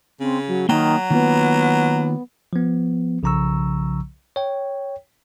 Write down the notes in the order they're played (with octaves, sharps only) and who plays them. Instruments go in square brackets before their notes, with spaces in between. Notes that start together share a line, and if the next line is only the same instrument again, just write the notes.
[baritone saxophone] C#3 [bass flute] C4
[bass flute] F#3
[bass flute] D#3 [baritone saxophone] F#3 [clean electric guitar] A#3 G5
[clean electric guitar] D#3 A#3 F4 [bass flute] B3
[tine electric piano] F3 B3
B1 C#3 F3 A#5 C#6 E6
C#5 G5